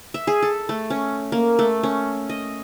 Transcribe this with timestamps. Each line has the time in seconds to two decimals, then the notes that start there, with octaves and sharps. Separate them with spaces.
0.14 E5
0.27 G#4
0.42 A4
0.69 A3
0.90 C#4
1.32 A#3
1.59 A3
1.83 C#4
2.29 D#5